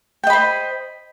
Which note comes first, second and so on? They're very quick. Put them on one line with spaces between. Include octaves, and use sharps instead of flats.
G5 D#5 B5 C5